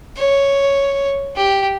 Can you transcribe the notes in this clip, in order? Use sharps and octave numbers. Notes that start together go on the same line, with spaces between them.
C#5
G4